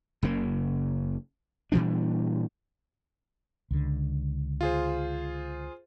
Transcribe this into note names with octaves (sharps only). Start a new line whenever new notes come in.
F#1 C#3 A#3
A#2 E3 G3 D4
C#2 D3
F4 G#4 C5